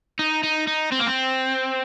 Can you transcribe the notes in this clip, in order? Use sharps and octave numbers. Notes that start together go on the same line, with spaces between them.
D#4
D#4
D#4
C4
A#3
C4